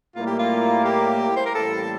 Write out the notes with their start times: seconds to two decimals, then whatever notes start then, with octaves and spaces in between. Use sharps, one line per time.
0.15 A2 G3 A#3 E4 F4
0.27 G4
0.39 F4
0.85 G4
1.36 C5
1.46 A#4
1.55 A1 A2 G3 A#3 E4 A4